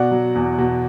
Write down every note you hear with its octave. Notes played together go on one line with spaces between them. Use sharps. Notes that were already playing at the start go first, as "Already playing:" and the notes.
Already playing: B2 D5 F#5
F#3
E2
B2